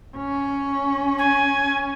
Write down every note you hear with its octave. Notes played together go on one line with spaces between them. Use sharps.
C#4
G#5